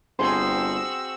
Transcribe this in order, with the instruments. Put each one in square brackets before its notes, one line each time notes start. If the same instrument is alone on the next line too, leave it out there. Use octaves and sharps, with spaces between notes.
[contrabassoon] G1 [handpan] C4 G#4 C5 [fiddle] F#4 E6 [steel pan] G#5 C6